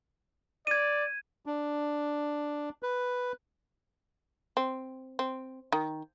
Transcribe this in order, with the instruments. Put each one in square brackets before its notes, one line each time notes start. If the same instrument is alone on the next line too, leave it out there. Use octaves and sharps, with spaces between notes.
[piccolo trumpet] D5 [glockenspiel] G#6 D#7
[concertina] D4
B4
[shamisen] C4
C4
D#3